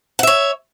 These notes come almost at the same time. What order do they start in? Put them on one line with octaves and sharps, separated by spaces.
F#5 E5 C#5